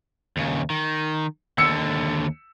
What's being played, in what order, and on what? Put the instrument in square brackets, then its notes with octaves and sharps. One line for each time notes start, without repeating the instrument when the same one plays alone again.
[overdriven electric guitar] D#2 C#3
D#3
[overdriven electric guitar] D#2 D3 [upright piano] E6 C#7